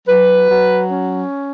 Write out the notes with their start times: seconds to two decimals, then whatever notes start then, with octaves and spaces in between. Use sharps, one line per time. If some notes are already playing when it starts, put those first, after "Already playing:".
0.08 F#3 B4
0.48 F#3
0.90 C#4